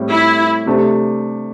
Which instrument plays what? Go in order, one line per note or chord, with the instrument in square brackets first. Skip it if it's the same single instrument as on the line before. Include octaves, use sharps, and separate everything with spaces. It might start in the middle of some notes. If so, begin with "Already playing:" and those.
Already playing: [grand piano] A2 G3 C4
[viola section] E4
[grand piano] C3 A3 D4 G4 C5